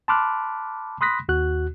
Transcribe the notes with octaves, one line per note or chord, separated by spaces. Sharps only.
A5 B5 C6 D6 F6 F#6
B5 C6 D#6 F#6 A#6 B6
D#2 F#4 F#6